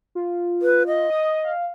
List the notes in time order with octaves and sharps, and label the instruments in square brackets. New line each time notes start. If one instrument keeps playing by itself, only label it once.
[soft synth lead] F4
[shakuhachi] B4
D#5
[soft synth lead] D#6
F5